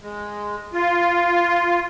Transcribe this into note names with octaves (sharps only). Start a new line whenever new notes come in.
G#3
F4